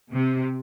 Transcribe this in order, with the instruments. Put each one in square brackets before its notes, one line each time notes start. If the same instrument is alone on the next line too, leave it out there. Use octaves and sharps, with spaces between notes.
[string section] C3